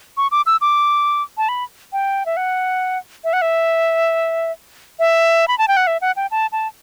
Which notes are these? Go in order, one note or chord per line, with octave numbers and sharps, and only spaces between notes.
C#6
D6
E6
D6
A5
B5
G5
E5
F#5
E5
F#5
E5
E5
B5
A5
G5
F#5
E5
F#5
G5
A5
A5